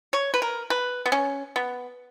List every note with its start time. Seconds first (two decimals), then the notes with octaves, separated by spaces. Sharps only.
0.13 C#5
0.34 B4
0.42 A#4
0.70 B4
1.06 B3
1.12 C#4
1.56 B3